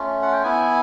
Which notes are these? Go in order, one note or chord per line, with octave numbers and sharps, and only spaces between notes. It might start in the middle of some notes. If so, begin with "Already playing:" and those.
Already playing: A3 C#4 F4
F#5
G5
B3 E4 G#5